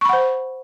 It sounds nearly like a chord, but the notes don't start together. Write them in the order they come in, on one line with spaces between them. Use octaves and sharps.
C#6 B5 F#5 C5